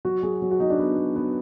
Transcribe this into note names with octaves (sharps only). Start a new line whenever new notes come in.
F#3 F#4
F#3 G#4
F#3
F#4
F#3 D#4
D4
F#3 B3
F#3
F#3 B3